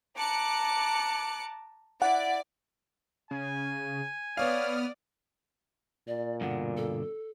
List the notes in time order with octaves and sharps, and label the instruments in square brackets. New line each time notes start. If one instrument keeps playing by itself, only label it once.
[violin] A5 A#5 [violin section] D6 F#6 C#7
[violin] E4 [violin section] D5 [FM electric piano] F#5
[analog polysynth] C#3 [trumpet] G#5
[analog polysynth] B3 D#6 F6 [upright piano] C#5 F5 [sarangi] D5
[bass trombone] A#2 [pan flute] D5
[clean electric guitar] G2 B2 D3 [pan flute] F#5
[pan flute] A4